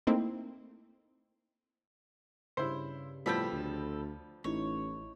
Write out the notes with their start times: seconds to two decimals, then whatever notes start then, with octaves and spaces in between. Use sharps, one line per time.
0.07 A3 A#3 C4 D#4 E4
2.57 G2 C#3 E4 C5
3.26 A2 F3 G3 B3 C4 A4 B5
3.52 D2
4.44 A1 D#4 E4 C#5